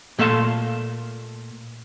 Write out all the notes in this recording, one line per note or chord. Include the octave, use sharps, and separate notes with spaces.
A#2 A3 A4 F5 A5 C6